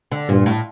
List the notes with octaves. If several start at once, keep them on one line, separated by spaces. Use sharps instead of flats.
D3
G2 A#2
A2